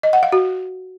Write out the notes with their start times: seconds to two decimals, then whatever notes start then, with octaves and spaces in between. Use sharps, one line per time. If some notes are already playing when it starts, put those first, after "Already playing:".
0.03 D#5
0.13 F#5
0.23 F5
0.32 F#4